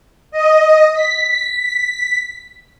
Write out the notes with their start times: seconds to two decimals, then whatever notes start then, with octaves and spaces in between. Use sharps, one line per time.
0.31 D#5
0.94 B6